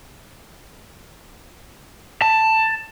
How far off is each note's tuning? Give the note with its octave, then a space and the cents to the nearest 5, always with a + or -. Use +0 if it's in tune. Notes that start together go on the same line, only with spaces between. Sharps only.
A5 +10